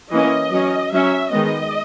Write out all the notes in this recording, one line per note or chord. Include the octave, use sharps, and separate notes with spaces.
E3 A#3 C#4 D#5
F#3 C#4
F#3 C#4 E5
D#3 G#3 B3 D#5